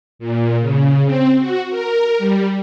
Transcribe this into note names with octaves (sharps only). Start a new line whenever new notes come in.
A#2
C#3
C4
F#4
A#4
G3